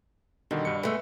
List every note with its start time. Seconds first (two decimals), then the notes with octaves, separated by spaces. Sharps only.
0.51 B2 D3 D#3 G3
0.65 G2 G3 C#7
0.83 G#3 A3 B4 E5 E6